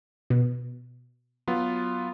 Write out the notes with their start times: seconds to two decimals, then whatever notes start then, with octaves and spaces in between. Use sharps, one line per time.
0.30 B2
1.48 F#3 B3 F4